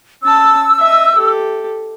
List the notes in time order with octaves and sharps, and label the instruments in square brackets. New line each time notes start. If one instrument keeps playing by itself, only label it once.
[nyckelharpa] C#4 A5 [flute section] E6
[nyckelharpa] D#5 E5
G4 A4